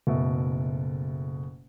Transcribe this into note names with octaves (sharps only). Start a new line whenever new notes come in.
F#1 B2 A3 A4 E5